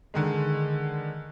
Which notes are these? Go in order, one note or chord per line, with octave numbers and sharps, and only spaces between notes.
D3 D#3 G#3